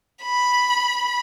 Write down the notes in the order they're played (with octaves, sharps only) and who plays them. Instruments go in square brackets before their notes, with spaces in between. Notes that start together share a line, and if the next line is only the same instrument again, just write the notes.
[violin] B5